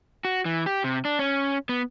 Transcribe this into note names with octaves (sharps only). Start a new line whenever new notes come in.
F#4
E3
G4
C3
D4
C#4
B3